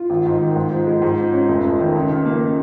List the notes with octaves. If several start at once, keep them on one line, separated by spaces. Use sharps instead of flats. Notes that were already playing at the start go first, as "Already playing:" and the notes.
Already playing: F4
G#1
G#2
D#3
G#2
F3
G#3
G#2
F3
C#4
F1
F2
D#3
C#2
C#3
A#3